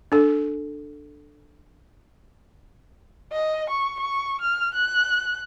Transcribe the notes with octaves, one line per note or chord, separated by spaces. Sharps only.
D4 A4
D#5
C#6
C#6
F6
F#6